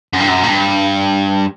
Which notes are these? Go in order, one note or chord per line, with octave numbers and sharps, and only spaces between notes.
F#2
G2
F#2
A#2
G2